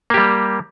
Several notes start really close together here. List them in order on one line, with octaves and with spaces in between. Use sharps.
A#3 G4 G3